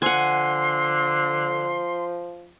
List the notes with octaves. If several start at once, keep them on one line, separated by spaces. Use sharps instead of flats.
D3 F3 F#5 G#5 C6